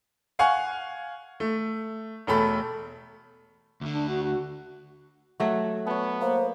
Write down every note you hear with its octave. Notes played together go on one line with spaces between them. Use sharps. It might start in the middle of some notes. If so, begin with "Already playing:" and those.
F5 F#5 G#5 C#6
A3
E1 A3 A4 B5
D2 D3
D4
F#4
F#4
F#3 A3 F#4 F#5
B3 C#5 A5
A#3 C5